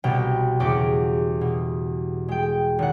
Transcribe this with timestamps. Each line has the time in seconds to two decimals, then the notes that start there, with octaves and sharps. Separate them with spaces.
0.04 C2 B2 G5 A#5
0.60 E2 C#3 F#4 G4 D6
1.41 B2
2.28 G#3 G5
2.79 G#1 F#5